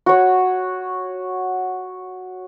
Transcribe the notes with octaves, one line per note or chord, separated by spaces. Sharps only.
F#4 C#5